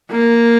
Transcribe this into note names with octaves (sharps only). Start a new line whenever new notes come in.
A#3